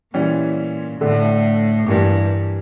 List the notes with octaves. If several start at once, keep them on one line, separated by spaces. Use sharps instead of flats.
A#2 E3 G3 C#4
A2 D3 A3 D4
G2 E3 A#3 D4